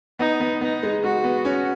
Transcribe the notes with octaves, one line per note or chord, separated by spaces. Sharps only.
B3 D#4
B3
B3 D#4
G#3
G#3 F#4
B3
C#4